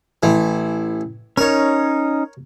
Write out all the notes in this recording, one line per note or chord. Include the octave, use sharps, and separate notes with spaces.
A1 E3
C#4 D#4 A#4 C#5